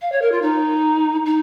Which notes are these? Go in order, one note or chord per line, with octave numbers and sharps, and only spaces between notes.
F5
C#5
A#4
F4
D#4
D#4